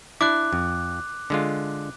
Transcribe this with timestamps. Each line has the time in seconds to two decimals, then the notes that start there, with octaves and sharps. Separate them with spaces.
0.21 D4 E4 D6 F#6
0.53 F2
1.30 D3 G#3 F4